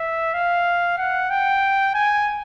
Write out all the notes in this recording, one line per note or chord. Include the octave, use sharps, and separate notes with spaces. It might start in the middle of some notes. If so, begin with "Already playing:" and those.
Already playing: E5
F5
F#5
G5
G#5